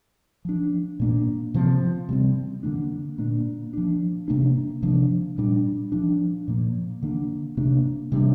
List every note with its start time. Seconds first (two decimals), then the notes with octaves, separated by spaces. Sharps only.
0.45 F3 D4
1.00 A#2 A#3 D4
1.54 C3 F3 C4
2.09 C3 G3 C4
2.63 D3 F3 A#3 D4
3.18 A#2 A#3 D4
3.73 F3 D4
4.28 C3 A#3 D4
4.83 C3 F3 D4
5.38 A#2 G3 D4
5.92 F3 D4
6.48 A#2 F3 A#3
7.03 D3 A#3 D4
7.57 C3 A#3 D4
8.12 C3 G3 D4